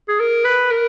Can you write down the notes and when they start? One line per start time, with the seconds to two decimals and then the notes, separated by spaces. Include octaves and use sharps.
0.08 G#4
0.20 A#4
0.44 B4
0.71 A#4